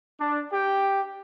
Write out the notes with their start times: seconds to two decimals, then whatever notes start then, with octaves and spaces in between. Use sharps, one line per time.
0.20 D4
0.51 G4 G5